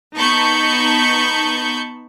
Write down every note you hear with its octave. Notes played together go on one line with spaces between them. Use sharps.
B3 D#4 A5 B5 C#6 G6